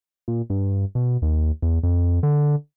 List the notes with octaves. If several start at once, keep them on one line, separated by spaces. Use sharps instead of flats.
A#2
G2
B2
D#2
E2
F2
D3